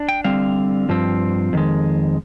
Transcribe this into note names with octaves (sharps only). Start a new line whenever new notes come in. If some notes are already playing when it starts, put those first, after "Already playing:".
Already playing: D4
G5
D3 G3 C4 F5
G2 F3 C4
F2 D#3 G#3